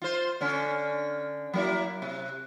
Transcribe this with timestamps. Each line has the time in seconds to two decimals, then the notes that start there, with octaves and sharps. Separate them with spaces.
0.02 F4 C5
0.41 D3 C#4
1.54 F#3 A#3 E4
2.02 C3